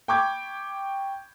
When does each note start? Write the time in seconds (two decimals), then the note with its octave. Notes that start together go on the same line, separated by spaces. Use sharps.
0.08 G5 B5 C#6 D6 G6 G#6